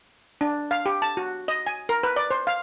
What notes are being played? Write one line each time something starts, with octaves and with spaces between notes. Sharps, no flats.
D4
F5
G4
A5
F#4
D#5
G#5
A#4
B4
D5
C5
F5